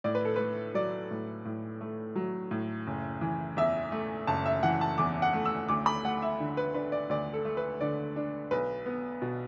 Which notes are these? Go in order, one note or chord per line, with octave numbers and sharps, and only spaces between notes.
A2 D5
B4
A4
A3 B4
F#3 D5
A2
A2
A3
F#3
A2
F#1
E3
E2 E5
A3
F#1 A5
E5
E3 F#5
A5
E2 D6
F#5
A3
E6
D2 D6
B5
A3 F#5
E5
D3
B4
D4 B4
D5
D2 D5
A4
A3
B4
D3 D5
D4
B1 B4
B3
B2